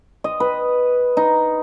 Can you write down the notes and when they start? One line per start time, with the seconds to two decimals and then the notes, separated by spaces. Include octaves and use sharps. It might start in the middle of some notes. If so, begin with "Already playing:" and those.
0.24 D#5
0.40 B4
1.17 D#4